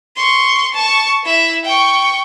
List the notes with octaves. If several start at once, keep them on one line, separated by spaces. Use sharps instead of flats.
C6 C#6
A5 C#6
E4 E5
G5 C#6